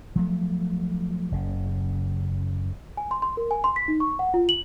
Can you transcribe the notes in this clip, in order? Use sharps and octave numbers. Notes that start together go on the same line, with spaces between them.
F3 F#3 A3
F#1 C#3
G#5
C6
C6
A#4
G#5
C6
B6
D#4
C#6
F#5
F4
F#7